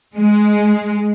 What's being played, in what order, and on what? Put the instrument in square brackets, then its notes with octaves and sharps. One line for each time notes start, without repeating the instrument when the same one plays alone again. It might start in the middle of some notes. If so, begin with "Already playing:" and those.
[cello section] G#3